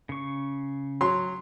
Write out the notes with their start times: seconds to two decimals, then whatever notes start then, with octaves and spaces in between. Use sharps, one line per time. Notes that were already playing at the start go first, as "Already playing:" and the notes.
0.09 C#3 C#6
1.01 F#3 C6